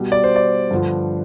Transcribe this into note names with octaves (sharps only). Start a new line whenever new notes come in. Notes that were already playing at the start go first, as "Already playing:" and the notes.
Already playing: B2 G3
D5
C5
D5
G2 D3 F3